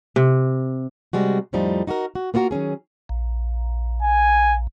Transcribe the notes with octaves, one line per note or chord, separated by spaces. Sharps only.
C3
C3 G3 G#3 F#4
F2 A2 F3 G3 D#4
D#4 F#4 G#4 A#4
F#4
A#3 B3 F4 F#4 A#4
D#3 F#3 C#4 G#4
A#1
G#5